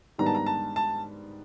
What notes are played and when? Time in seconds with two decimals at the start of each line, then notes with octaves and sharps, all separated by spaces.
0.18 G#2 D#3 G3 B3 D4 A#5
0.26 A5
0.35 A#5
0.46 A5
0.76 A5